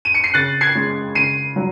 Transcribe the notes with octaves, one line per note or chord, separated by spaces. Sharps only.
D#7
C#7
C7
C#3 F#6 A6
G#6 C7
G#3 C#4
C#3 C7 D#7
F#3